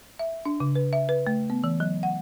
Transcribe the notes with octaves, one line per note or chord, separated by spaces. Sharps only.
E5
D4
C#3
B4
E5
B4
A3
B3
E3
F#3
F#5